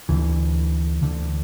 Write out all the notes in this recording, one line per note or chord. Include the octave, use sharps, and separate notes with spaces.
D2 D3 E3
D2 D3